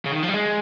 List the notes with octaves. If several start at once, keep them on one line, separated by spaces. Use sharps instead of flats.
C#3
D#3
F3
G3
G#3